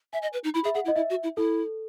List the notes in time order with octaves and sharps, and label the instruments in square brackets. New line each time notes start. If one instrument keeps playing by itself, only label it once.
[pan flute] E5 [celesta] G#5
[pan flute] D#5
B4
D#4
[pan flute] E4 [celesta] B5
[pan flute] G#4 [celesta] E5
[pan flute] G#4 [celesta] F#5
[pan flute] E4
[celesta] D#5
[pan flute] E4 [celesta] E5
[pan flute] F#4
E4
[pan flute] E4 [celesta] A4